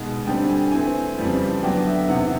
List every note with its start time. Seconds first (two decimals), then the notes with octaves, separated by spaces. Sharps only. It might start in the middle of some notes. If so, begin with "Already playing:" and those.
Already playing: B2 G#3 B3 D#4
0.26 D3 G3 C4 G5
0.48 G#5
0.71 E3 A3 C4 G#5
1.17 F2 C#3 E3 G3 C4
1.63 D3 F#3 B3 D4 G5
1.86 E5
2.09 E2 C3 D#3 F#5